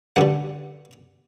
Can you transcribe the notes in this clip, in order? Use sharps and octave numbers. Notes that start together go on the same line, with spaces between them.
G2 D3 G3 F#5